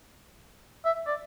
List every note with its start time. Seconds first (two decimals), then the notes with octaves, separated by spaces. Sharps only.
0.85 E5
1.07 D5